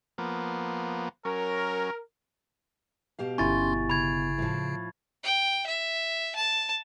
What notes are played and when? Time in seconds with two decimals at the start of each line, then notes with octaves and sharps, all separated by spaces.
0.18 F3 A#3 B3
1.25 F#3 C#4 A#4
3.19 B2 G4 F5
3.38 G1 C#4 E4 G#5 C6 C#6 A6
3.90 C#3 B5 G#6
4.38 A2 F3
5.24 G5
5.66 E5
6.36 A5